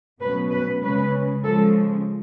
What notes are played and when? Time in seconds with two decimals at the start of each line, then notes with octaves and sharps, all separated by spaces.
0.20 B2 F#3 A3 C#4 B4
0.50 B4
0.81 C#3 G#3 C#4 B4
1.42 C#3 F3 G#3 A4